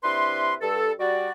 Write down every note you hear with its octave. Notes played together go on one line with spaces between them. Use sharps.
C3 D4 E4 B4 C6
G2 A4
G3 F#4 D5